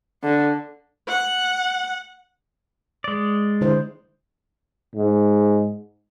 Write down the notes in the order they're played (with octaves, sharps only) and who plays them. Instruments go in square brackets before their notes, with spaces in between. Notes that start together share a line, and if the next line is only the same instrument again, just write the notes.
[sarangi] D3
[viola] F#5
[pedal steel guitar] G#3 D5
[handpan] D3 E4 C5
[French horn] G#2